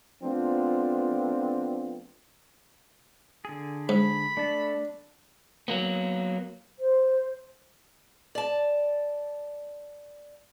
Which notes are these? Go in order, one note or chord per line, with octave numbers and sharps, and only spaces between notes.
F3 A3 B3 C4 D4 F4
D3 G#4
G#2 B5
A3 D4 A5
F#3 A#3 B3
C5
D5 A5